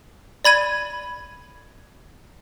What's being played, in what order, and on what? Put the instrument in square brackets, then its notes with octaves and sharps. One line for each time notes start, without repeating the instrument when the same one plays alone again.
[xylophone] D5 B5 G#6 D#7